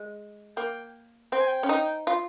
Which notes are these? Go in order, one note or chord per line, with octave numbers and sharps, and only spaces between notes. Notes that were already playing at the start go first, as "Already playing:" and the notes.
Already playing: G#3
A#3 G5
C4 G5
G#5
G5
C#4
D#4
F4